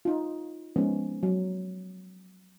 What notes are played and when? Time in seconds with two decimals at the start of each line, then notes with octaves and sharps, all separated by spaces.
0.05 D#4 F4
0.76 F3 G#3 B3 C#4 D#4
1.23 F#3